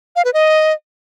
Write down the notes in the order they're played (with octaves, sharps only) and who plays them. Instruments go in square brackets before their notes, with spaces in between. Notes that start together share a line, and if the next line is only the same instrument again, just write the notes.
[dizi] F5
B4
D#5